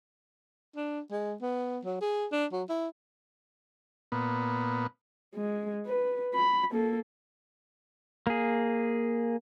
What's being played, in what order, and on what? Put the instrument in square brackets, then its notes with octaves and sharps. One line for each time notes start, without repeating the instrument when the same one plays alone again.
[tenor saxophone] D4
G#3
B3
F#3
G#4
D4
F#3
E4
[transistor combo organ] A#2 B3
[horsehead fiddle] G#3
B4
B5
A#3 A4
[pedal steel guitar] A#3 G#4